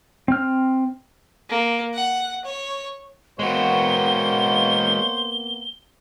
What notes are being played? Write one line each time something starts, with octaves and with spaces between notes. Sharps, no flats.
C4 F6
A#3
F#5
C#5
G#3 A#3 B3 F#4 C5 C#5 G7